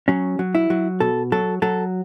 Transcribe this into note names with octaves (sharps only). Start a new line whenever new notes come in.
F#3 C#4
F#3
E4
F#3
B2 A4
F#3 A4
F#3 A4